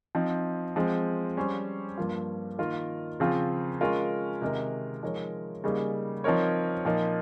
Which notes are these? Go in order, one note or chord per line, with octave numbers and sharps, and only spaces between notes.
F3 C4 D#4
F3 G#3 C4
G3 C#4 G#4 C5
G2 F3 A#3 F4
D#3 A#3 F4 A#4
C#3 F3 C4 F4
G#3 C#4 F4 A#4
C3 D#3 G#3 D#4 A#4
F3 G#3 D#4 A#4 C#5
C#3 G3 A#3 D#4 G#4
F3 C4 D#4 A#4 C#5
A#2 F3 A#3 D#4